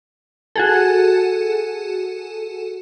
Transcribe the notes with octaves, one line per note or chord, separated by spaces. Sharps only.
F#4 G#4 A4